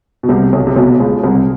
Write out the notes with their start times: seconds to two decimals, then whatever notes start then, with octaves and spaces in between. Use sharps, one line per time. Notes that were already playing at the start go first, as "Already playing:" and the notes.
0.23 B2
0.29 C2 C3
0.53 B1 B2
0.67 C3
0.76 B1 B2
1.00 C#2 C#3
1.24 C2 C3